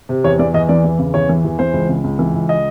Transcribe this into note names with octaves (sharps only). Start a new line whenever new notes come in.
C3
E2 C#5
E3 D5
E2 D#5
E3 D5
E2
C#3
E2 C#5
E3
E2
E3 C5
C#2
C#3
C#2
E3
C#2
D#5